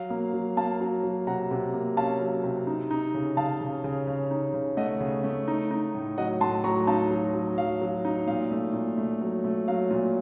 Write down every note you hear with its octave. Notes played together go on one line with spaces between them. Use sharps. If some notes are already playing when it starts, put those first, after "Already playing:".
Already playing: F#3 F5
A#3
F#3
A#3 F5 A5
F#3
F#3
C3 F#5 A#5
C3
A#3
C#4 F5 A5
F#3
C3
D#4
D#4
C#3
C#3 F5 A5
C#3
C#3
C#3
D#4
C#3
A3 D#5 F#5
C#3
A3
D#4
D#4
A2
F#3 D#5 F#5
A2 A5 C6
F#3 A#5 C#6
D#4 F5 A5
F#3
F#3
F#3 F5
F#3
D#4
A#2 F5
A3
A#2
A3
F#3
A3
F#3 F5
A#2